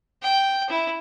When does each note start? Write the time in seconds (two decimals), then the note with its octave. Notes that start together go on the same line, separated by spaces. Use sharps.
0.23 G5
0.70 E4